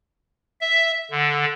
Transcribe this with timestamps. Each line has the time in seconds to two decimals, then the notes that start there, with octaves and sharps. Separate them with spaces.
0.61 E5
1.11 D3